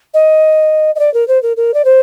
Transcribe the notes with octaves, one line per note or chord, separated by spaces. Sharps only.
D#5
D#5
D5
A#4
C5
A#4
A#4
D5
C5